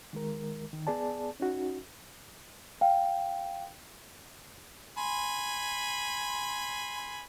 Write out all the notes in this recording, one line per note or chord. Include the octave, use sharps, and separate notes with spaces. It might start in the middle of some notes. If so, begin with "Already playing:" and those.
D#3 G#3 A#4
D#3
B3 G#4 D5 A5
C#4 D#4 F#4
F5 G5
G#5 B5 C6